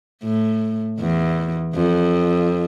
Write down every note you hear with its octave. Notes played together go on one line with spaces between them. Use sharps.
A2
E2
F2